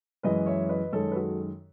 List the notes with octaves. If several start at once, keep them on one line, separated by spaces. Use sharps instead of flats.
F#2 E3 G#3 B4 D#5
C#5 E5
B4 D#5
F#2 D#3 G#3 A4 C#5
B4
F#4 A4